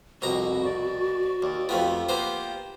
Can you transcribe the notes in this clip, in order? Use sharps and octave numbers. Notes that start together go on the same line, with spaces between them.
C2 F2 B2 F#4 A#5
D5
D#2 D5
F2 A3 B3 F4 G4
A#3 B3 C5